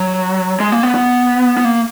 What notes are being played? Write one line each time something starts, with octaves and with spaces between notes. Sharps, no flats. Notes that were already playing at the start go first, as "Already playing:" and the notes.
Already playing: F#3
G#3
A#3
B3
B3
B3
A#3